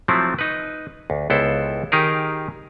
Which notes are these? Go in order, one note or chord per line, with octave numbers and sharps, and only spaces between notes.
F3 F#3 A3 C4 E4
D#4 B4
D2
C#2 B3 E4 A4 C5
D#3 D#4 G4 G#4 A#4